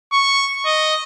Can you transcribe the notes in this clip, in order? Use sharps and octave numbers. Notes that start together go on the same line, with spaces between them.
C#6
D#5